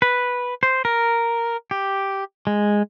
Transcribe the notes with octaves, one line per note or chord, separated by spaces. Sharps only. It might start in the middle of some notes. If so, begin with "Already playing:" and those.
B4
C5
A#4
G4
G#3